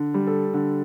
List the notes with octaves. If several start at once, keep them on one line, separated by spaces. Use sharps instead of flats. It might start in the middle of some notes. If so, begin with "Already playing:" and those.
Already playing: D3
G3
A4
D3